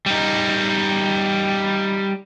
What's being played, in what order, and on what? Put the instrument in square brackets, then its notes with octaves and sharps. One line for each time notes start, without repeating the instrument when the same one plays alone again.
[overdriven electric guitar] G3 D#4